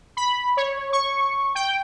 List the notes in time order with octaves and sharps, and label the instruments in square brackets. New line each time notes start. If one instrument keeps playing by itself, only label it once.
[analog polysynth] B5
C#5
C#6
G5